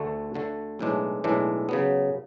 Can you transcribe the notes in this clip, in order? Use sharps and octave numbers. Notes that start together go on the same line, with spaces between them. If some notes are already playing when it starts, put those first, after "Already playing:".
Already playing: D2 D3 A3
D2 D3 A3
B1 A2 E3 G#3 D4
B1 A2 E3 G#3 D4
C#3 F#3 B3